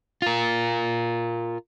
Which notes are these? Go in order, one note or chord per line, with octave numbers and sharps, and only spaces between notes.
F4 A#4